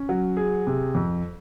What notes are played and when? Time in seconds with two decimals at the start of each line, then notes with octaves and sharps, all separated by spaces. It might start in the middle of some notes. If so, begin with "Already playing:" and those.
Already playing: C#4
0.09 F#3
0.37 G#4
0.67 C3
0.95 F2